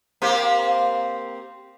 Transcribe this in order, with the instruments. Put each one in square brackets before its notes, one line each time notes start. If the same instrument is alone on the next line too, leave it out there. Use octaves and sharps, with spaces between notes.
[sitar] A#3 C4 G4